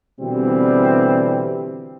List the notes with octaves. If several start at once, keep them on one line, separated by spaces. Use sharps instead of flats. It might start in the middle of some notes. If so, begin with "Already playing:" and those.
B2 D3 E3 G3 C4